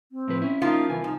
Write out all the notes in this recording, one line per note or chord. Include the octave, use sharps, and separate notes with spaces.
C4
A2 F3 B4
C#4 E4
F3 A#3 D#4 F4
C2 E3 G#5
F3 D#4